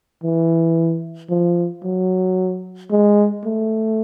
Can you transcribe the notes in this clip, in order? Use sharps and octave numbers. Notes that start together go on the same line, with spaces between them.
E3
F3
F#3
G#3
A3